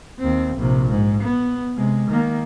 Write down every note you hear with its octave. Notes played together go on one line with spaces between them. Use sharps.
D#2 C4
A#1 C3
G#2
B3
C3 G#3
D#3 A#3